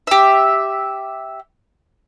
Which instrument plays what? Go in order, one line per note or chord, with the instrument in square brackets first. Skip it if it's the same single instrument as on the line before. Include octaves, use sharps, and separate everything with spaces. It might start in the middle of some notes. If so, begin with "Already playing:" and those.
[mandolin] G4 E5